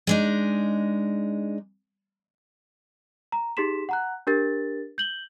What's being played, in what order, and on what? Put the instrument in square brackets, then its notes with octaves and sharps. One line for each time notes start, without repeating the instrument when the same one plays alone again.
[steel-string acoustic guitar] G#3 D4 D#4
[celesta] A#5
D#4 G4 G#4 C6 B6 E7
F#5 A#5 F#6
D4 G4 A#4 A6
G6 F#7 G7